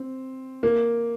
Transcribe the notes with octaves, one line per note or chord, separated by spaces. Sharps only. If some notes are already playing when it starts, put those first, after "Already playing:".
Already playing: C4
A#3